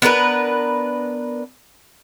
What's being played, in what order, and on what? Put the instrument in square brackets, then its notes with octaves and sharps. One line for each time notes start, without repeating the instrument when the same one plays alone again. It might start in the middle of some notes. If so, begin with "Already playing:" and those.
[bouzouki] B3 D4 A#4 B4